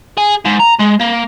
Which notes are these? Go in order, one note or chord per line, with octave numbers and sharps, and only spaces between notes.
G#4
G#2
A#5
G#3
A#3